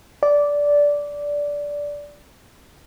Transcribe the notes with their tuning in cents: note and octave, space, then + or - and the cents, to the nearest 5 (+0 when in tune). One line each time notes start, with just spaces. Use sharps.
D5 -10